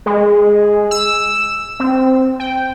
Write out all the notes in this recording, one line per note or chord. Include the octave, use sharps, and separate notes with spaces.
G#3
E6
C4
G5